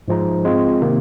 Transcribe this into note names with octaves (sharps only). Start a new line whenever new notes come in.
G#2 F3 G#3 D#4
G#3 C4 F4
C3 D#3 A#3